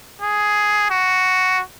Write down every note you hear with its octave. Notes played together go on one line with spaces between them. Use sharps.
G#4
F#4